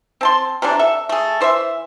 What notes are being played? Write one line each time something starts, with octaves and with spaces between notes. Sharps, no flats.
C4 A5 C6
C3 E3 F#3 D4
A4 E5
A3 G#4
E3 C5 D#5 E5